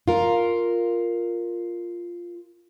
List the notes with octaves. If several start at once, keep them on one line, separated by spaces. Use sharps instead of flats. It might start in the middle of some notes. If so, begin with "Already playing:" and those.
F4 A#4